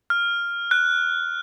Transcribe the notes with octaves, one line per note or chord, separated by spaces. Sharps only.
F6
F#6